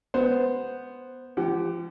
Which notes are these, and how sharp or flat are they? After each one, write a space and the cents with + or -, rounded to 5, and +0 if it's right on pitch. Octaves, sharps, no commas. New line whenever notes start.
B3 +0 C5 -5
F3 -35 G4 +0 F#5 +30